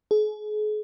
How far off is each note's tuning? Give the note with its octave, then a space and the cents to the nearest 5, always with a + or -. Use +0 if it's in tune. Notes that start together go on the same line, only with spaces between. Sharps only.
G#4 +40